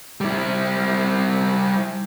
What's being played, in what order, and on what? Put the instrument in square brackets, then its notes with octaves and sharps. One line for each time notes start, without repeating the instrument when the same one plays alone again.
[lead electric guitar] G3 E4